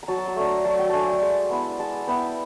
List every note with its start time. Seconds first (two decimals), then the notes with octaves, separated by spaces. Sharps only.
0.03 A#5
0.08 F#3 A5
0.18 A5
0.27 A#5
0.36 A3 D4
0.46 A#5
0.64 F#3 A5
0.79 G5
0.89 A3 D4 G#5 A5
1.08 G5
1.21 G#3 A5
1.50 B3 E4
1.79 G#3 A5
2.07 B3 E4 G5